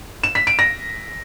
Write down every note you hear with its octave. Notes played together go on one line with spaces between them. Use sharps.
E7
B6
D7
A#6